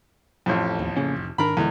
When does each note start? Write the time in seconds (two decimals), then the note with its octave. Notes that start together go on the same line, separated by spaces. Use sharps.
0.46 A1 F2
0.79 D#2
0.96 C#3 A#3 C#4
1.16 F1
1.38 G#2 D#3 D4 A#4 B5
1.57 D#1 E2 D3 G#3